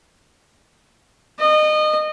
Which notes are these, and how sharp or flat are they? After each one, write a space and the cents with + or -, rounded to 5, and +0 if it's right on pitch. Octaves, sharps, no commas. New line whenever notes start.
D#5 -25